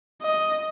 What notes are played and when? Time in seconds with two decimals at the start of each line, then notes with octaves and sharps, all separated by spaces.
0.22 D#5